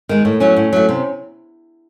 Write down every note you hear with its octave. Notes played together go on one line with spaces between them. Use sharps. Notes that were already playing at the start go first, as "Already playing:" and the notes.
D#3 G#3
A2
F#3 A3 C#4
A2
F#3 A3
C3